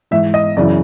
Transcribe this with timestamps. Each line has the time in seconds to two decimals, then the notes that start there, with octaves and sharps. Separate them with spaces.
0.11 G#2 E3 E5
0.34 D#5
0.57 F#2 C#3 E3 D5